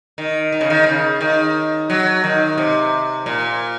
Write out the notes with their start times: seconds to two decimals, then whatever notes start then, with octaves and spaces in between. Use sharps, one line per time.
0.18 D#3
0.52 D#3
0.61 C#3
0.70 D#3
0.86 C#3
1.21 D#3
1.90 F#3
2.24 D#3
2.58 C3
3.26 A#2